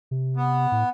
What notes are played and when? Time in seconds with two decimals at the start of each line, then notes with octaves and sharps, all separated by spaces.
0.11 C3
0.37 B3
0.72 A2